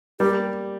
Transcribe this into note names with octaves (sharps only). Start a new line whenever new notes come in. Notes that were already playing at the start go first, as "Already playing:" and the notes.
G3 A#3 G4